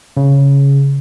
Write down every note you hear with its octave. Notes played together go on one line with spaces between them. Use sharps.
C#3